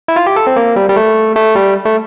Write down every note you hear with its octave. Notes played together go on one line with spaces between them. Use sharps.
E4
F4
G4
A4
C4
A#3
G3
G3
A3
A3
G3
A3